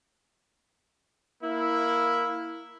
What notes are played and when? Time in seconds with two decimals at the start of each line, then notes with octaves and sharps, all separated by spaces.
1.43 A#3 E4